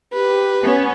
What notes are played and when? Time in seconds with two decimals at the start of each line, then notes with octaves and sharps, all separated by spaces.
0.13 G4 B4
0.62 B3 C#4